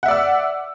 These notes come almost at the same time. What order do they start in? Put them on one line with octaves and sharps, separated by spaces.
F#5 E5 D5 E6